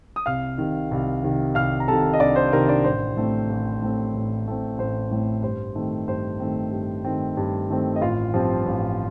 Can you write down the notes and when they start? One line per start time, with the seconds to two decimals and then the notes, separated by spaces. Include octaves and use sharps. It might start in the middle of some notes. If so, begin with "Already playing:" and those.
0.16 D#6
0.26 C2 F5 F6
0.58 C3 D#3
0.91 C2
1.23 C3 D#3
1.55 C2 F5 F6
1.80 A#5
1.88 C3 D#3 A4 A5
2.13 D#5
2.20 C2 D4 D5
2.36 C5
2.53 C3 D#3 A#4
2.68 D4 D5
2.84 A1 C5
3.17 A2 A3 C4
3.49 A1
3.82 A2 A3 C4
4.14 A1
4.46 A2 A3 C4
4.78 A1 C5
5.11 A2 A3 C4
5.43 G2 C5
5.75 D#3 A3 C4
6.07 G2 C5
6.40 D#3 A3 C4
6.72 G2
7.05 D#3 A3 C4
7.37 G2
7.70 D#3 A3 C4
7.96 D#5
8.01 A1 F4 F5
8.34 G2 F3 C4
8.66 A1